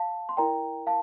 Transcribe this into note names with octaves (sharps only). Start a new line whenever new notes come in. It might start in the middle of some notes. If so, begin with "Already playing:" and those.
Already playing: F5 A5
C6
E4 A#4 D5 G5 A#5
F5 A5